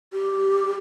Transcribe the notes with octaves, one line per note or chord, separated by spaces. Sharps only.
G4